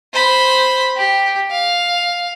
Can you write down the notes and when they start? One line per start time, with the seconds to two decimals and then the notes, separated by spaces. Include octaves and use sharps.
0.13 C5 B5
0.96 G4
1.51 F5